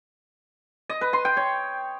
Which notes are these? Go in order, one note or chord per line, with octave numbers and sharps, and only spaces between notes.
D#5
B4
C6
G5
C#5